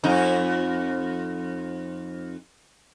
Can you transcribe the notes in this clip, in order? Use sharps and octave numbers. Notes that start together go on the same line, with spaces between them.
F2 D#4